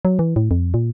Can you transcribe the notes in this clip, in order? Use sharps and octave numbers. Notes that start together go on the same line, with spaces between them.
F#3
E3
A2
F2
A#2